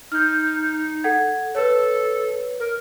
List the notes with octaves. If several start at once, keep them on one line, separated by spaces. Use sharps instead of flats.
D#4 F6 G6
A4 F#5 G#6
A4 B4 C#5
A#4